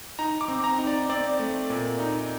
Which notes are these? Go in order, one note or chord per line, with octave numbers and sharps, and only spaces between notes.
D#4 A#5
D6
C4
A#5
D#4
D5
C4 D5
A3
A#2
D#4